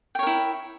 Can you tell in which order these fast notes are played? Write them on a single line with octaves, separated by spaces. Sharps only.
G5 C#5 A#4 E4